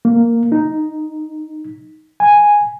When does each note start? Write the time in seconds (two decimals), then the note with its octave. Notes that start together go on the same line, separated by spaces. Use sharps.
0.05 A#3
0.52 D#4
2.20 G#5